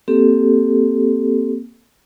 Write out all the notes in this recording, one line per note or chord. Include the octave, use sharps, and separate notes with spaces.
A#3 C4 G4 A4